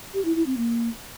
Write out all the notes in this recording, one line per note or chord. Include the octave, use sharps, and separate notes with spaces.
G4
E4
E4
C4
A#3